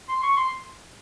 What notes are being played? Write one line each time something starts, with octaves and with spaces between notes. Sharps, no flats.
C6
C#6
C6